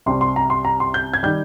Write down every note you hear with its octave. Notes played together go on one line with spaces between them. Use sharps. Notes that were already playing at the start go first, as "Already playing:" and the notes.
C2 C3 G3 C6
C6
A#5
C6
A#5
C6
G6
G#6
D#3 G3 G6